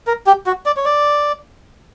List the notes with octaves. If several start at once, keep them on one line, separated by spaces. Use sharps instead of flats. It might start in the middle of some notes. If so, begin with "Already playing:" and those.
A#4
G4
F#4
D5
C#5
D5